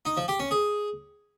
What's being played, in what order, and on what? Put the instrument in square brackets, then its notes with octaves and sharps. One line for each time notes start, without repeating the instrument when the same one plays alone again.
[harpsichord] D#4
F3
G4
C#4
G#4